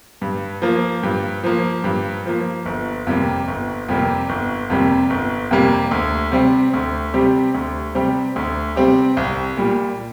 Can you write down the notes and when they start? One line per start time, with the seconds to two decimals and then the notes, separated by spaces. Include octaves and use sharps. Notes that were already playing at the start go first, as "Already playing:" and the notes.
0.22 G2
0.62 F3 A#3
1.03 G2
1.44 F3 A#3
1.84 G2
2.26 F3 A#3
2.66 G1
3.07 F2 C3 G3 A#3
3.48 G1
3.88 F2 C3 G3 A#3
4.29 G1
4.70 F2 C3 G3 A#3
5.10 G1
5.51 F2 C3 G3 A#3
5.91 D2
6.32 C3 G3 C4 G4
6.74 D2
7.14 C3 G3 C4 G4
7.54 D2
7.95 C3 G3 C4 G4
8.36 D2
8.76 C3 G3 C4 G4
9.17 C2
9.57 A#2 G3